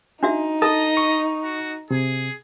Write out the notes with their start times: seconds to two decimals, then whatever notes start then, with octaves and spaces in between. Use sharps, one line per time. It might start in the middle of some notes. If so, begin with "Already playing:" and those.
0.23 D4 D#4 F#4 E5
0.62 A4 D#5 A5
0.97 C#6
1.44 F#4
1.91 C3 G#4